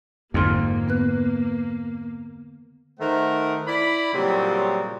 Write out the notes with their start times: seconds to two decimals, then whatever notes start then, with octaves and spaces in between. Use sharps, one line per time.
0.34 F2 G#2 D3 A#3 C6 F6
0.88 B3 B4 F#6
3.00 D#3 A3 A#4 C5 F#5
3.67 E4 D5 B5
4.13 A#2 C#3 F#3 G3 C4